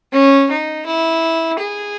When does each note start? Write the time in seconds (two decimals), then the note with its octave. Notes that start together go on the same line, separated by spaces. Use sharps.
0.13 C#4
0.50 D#4
0.86 E4
1.60 G#4